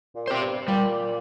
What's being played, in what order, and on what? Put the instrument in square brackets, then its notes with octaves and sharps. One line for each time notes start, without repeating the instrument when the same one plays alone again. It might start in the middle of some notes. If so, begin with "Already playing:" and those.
[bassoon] A#2
[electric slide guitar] C4 G4 C5
[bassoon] G2
[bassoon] A#2 [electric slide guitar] G3